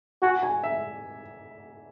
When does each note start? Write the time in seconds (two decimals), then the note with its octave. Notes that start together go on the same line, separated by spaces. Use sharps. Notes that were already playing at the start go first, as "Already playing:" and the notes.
0.22 F#4 G#5
0.43 G#5
0.64 E5